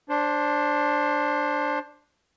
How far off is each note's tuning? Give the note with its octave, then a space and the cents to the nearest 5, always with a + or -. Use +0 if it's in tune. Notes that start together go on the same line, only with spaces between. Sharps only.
D4 +0 C5 +20 C6 +0